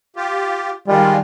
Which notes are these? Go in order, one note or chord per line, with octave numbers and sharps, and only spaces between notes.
F4 G4
D#3 G3 G#3 F4